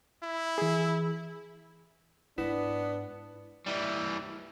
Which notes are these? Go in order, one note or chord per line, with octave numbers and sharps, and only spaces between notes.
E4
E3 G#4
G#2 B3 D4 E4
E3 G3